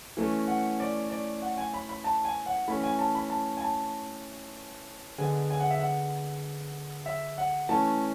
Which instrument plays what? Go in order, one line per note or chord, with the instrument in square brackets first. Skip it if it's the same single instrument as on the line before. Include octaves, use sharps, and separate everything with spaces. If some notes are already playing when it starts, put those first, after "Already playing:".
[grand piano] E3 A3 C#4
F#5
D5
D5
F#5
G#5
B5
B5
A5
G#5
F#5
E3 A3 C#4 B5
G#5
A5
B5
A5
G#5
A5
D3 G#3 B3 G#5
G#5
F#5
E5
F#5
E5
F#5
E3 A3 C#4 A5